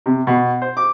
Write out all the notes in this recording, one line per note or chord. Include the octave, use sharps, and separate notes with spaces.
C3
B2
C5
D6